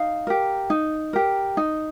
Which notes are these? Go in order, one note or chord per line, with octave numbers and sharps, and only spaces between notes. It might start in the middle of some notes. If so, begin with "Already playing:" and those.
Already playing: D#4 F5
G4 A#4
D#4
G4 A#4
D#4